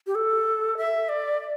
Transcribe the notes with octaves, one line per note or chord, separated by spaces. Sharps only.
G4
A4
E5
D5
D5